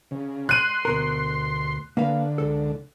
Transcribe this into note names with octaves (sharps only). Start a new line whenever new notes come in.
C#3
C6 F#6 D#7
D2 B2 A#4
D3 A#3 B4 F5
C#2 A4